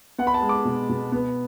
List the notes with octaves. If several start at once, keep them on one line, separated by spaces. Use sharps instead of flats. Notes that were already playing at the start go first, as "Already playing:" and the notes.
B3 F#5
B5
A5
G#3
D6
B2
B2
B3